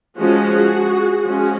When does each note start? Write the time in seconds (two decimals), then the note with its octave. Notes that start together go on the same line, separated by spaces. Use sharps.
0.18 F3 G#3 C#4 F#4 G#4
1.24 F3 G#3 C#4 F#4 G#4